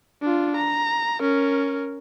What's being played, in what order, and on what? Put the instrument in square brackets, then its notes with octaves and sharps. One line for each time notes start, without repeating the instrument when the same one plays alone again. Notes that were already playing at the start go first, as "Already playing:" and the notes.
[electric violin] D4 F4
A#5
C#4 A#4